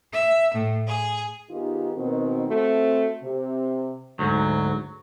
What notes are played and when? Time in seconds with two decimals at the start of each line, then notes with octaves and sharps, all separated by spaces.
0.14 E5
0.54 A2
0.87 G#4
1.50 D#3 B3 D#4 F4 G4 G#4
1.95 B2 D#3 C4
2.48 A3 C4 F#4
3.23 C3
4.19 D2 G#2 F#3